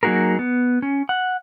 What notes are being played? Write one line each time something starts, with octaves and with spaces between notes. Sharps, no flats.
F#3 A#3 D#4 F#4 G#4 A#4
B3
C#4
F#5